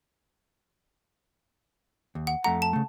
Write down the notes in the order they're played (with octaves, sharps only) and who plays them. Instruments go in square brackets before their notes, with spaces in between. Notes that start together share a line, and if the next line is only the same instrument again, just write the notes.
[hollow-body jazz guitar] D#2
[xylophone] F#5
[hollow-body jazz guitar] F2 A3 A#5 [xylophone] F#5
[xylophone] A5
[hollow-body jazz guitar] C#3 A3